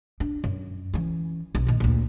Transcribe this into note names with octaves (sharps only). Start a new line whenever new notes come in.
D4
F#2
E3 C#4
B1
A#2 D#3
D2 A#2